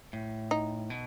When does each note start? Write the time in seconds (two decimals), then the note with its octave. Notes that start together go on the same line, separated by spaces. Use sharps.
0.13 A2
0.51 D#4
0.90 B2